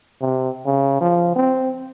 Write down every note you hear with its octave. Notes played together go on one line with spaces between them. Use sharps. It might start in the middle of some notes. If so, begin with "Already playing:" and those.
C3
C#3
F3
C4